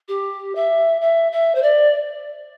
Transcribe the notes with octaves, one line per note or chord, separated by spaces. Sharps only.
G4
E5
E5
E5
C5
D5